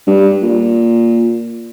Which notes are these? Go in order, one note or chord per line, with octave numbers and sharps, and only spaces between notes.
G2
A#2